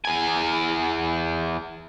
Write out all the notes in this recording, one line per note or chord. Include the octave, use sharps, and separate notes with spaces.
E2 G#5